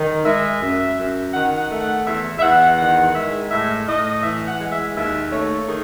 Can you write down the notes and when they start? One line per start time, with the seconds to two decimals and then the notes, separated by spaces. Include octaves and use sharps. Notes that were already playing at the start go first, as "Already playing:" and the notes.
Already playing: D#3
0.25 G#3 E5
0.61 F#2
0.97 F#2
1.33 D#3 F#5
1.57 F#5
1.70 A3
1.80 F#5
2.06 E2 E5
2.38 E5
2.42 E2 F#5
2.78 D#3 F#5
3.15 G#3 E5
3.51 A2 E5
3.87 A2 D#5
4.23 E3 E5
4.47 F#5
4.60 G#3
4.72 E5
4.96 D#2 E5
5.32 A3 C#5
5.68 D#3 G#4